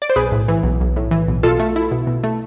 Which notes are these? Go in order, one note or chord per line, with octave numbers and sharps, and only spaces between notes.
D5
C5
B1 G#4 B4
A2
E3
B1
B1
A2
E3
B1
B2 F4 A4
A3
E4
B2
B2
A3